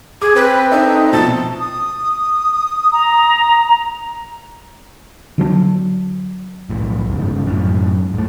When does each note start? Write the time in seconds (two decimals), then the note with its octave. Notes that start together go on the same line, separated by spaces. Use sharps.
0.22 G#4 D6
0.36 C4 B4
0.71 D4 D#4 A4 E5
1.13 B2 F3 A5 A6
1.60 D#6
2.92 A#5
5.38 D3 F#3 B3 D4
6.70 B1 A2
7.10 G1 G#2 C#3
7.47 F#2 A2
8.14 G#2 A3